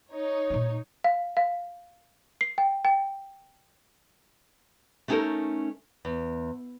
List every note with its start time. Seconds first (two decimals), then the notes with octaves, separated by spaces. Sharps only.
0.11 D#4 C#5
0.50 A#2 F4
1.04 F5
1.37 F5
2.41 C7
2.58 G5
2.85 G5
5.08 A3 B3 C#4 D#4 A4 A#4
6.05 E2